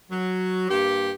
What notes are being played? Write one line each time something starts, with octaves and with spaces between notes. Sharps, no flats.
F#3
G2 A#3 G4